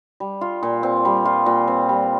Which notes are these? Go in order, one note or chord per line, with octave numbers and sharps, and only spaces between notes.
G3
F4
A#2
C4
G3
F4
A#2
C4
G3